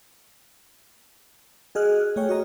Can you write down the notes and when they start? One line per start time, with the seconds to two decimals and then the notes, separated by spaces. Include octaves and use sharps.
1.75 F#4 G#4 D#5 F6 F#6
2.16 A3 G#4 C#5 G5
2.29 F#4 C#5 D#5 A#5